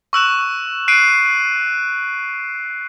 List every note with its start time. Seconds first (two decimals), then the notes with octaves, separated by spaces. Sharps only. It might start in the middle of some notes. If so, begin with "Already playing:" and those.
0.13 C#6 E6 F#6 E7
0.88 F#6 C7 D7 D#7